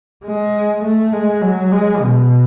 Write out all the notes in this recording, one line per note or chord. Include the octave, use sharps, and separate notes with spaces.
G#3
A3
G#3
F#3
G#3
B2